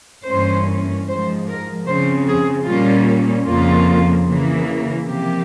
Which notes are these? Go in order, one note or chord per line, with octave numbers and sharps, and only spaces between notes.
G2 E3 A#3 C#4 C5
G#2 F3 G#3 C5
A#4
C#3 F3 C4 C5
G#4
A#2 G3 A#3 C#4 F4
F2 C#3 F3 A#3 F4
C#3 E3 A#3
C3 F3 A#3 G4